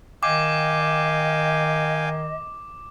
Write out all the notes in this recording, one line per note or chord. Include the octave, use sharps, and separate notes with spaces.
D#3 D#5 F5 G5 G#5 D6